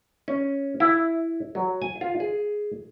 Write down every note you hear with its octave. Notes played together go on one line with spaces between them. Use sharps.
C#4
E4
F#3
G#5
F4
G#4